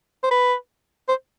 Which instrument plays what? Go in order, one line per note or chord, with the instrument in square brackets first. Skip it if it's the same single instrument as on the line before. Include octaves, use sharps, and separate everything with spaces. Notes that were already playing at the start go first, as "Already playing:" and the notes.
[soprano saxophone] C5
B4
C5